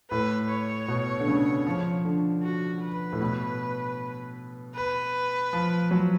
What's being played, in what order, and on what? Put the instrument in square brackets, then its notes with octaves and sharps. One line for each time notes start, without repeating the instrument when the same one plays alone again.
[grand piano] A2 [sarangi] B4
[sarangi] C#5
[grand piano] B2
D3
C#3
F3
D3
[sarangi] F#4
B4
[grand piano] A2
B2
[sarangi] B4
[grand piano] F3
F#3